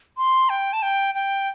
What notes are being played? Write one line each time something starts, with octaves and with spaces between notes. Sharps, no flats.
C6
G5
A5
G5
G5